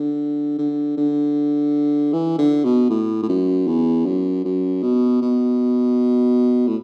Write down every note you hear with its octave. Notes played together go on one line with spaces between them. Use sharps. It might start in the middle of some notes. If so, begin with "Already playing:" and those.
Already playing: D3
D3
D3
E3
D3
B2
A2
A2
F#2
E2
F#2
F#2
B2
B2
A2